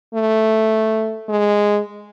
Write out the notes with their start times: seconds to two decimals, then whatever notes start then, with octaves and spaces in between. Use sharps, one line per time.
0.15 A3
1.29 G#3